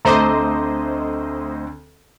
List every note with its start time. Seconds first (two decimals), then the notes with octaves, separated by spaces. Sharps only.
0.05 D2 D3 A3 C4 C5 D#5 A#5 D6